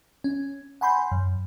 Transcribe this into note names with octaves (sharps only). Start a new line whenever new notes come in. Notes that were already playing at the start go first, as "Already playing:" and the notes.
C#4
F#5 G#5 B5 C6 G6
F#2